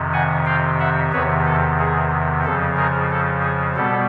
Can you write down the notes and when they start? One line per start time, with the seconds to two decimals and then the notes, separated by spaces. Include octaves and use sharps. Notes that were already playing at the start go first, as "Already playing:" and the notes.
Already playing: F2 C3 D#3
0.13 F#5 G#5
0.46 F5 G5
0.79 E5 F#5
1.12 E2 C3 D#3 B4 C#5
1.46 A4
1.79 G#4
2.45 F2 C#3 F3 A4
2.77 G#4 A#4
3.11 A4
3.43 G#4
3.76 B2 G3 B3 A4